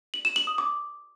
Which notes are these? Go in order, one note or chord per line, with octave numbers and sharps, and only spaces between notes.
F#7
E7
F#7
D#6
D6